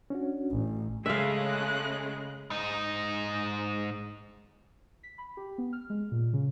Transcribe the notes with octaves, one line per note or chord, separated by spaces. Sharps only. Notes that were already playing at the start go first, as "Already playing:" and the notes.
C#4 D4 F#4
A1
C#3 G#3 A3 E5 F5 F#6
G#2 D#4
B6
B5
G4
B3
F6
G#3
A#2
C#3